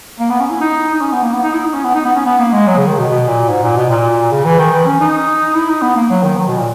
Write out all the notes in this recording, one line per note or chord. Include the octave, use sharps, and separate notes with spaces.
A#3
B3
C#4
E4
D#4
D#4
C#4
B3
A#3
B3
D#4
E4
D#4
C#4
B3
D#4
B3
C#4
B3
A#3
G#3
F#3
C#3
D#3
B2
B2
A#2
G#2
A#2
B2
A#2
C#3
E3
D#3
E3
C#4
D#4
E4
D#4
B3
A#3
F#3
D#3
F#3
B2
A#2